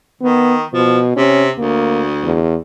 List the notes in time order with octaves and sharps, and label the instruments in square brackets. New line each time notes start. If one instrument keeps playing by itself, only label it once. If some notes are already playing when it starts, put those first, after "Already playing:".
[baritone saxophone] D#3 [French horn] B3
[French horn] B2 [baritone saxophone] F3
[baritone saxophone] C3 [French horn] C#4
[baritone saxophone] D2 [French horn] A#3
[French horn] E2